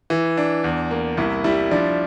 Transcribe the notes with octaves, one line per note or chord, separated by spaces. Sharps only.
E3 E4
D4
E2
A#3
C2 E4
G3 E4
F3 D4